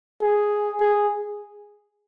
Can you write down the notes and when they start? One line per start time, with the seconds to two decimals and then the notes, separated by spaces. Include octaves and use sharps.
0.21 G#4
0.80 G#4